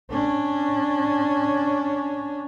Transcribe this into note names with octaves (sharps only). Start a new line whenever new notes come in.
C#4 D4